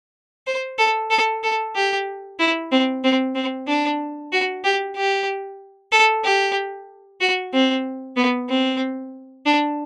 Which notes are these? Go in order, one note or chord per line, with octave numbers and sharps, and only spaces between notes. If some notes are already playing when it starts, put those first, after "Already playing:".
C5
A4
A4
A4
G4
E4
C4
C4
C4
D4
F#4
G4
G4
A4
G4
F#4
C4
B3
C4
D4